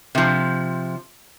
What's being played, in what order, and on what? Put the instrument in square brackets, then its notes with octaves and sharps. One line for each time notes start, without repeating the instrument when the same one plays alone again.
[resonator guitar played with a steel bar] C3 F3